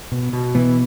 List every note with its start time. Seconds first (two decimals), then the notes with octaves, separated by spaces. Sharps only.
0.12 B2
0.33 B2
0.55 B2 E3 B3